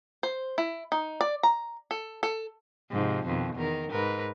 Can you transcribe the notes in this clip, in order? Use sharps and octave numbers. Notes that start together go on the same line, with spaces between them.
C5
E4
D#4
D5
A#5
A4
A4
G#2 C3 F3
F2 B2 D#3
E2 D#3 A#4
G#2 A#4 B4